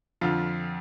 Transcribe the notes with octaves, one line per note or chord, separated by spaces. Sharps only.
F2 D3 F3 F4